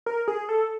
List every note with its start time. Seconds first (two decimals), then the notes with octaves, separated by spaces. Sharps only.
0.06 A#4
0.28 G#4
0.49 A4